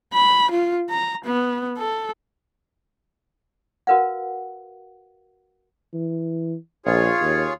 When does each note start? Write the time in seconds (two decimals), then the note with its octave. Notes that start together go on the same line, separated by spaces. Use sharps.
0.13 B5
0.51 F4
0.90 A#5
1.25 B3
1.78 A4
3.87 F#4 A#4 B4 F5 F#5
5.94 E3
6.86 A#1 F4 G#4 C#5
7.21 D#2